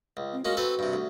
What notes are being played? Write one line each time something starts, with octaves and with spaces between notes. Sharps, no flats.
C#2
C4
G#3 A#3 C#4 F#4
C4 F#4 A4 B4
G2 C3
D2